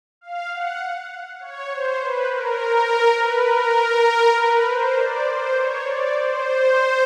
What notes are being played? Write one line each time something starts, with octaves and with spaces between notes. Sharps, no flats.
F5
F#5
C#5
C5
B4
A#4
B4
A#4
B4
C5
D5
C5
C#5
D5
C5